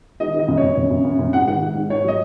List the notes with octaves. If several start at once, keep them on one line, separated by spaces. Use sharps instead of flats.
D#3 D#5
D#3 D#5
F#2
C#5
F#2
F#2
F#2
F#2
F#2
G#2 F#5
D#3 F#5
G#2
G#2
G#2 C#5
F#3 D#5